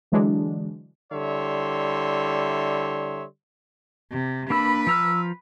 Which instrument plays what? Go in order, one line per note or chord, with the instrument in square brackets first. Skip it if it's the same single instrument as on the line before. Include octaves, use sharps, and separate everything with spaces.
[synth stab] D3 E3 F#3 G#3 D4
[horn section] D3 G3 E4 C#5 E5 C6
[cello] C3
[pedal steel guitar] A#3 D4 E6 [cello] B4 [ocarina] B5
[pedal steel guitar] F3 A#5 F6 [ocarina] E6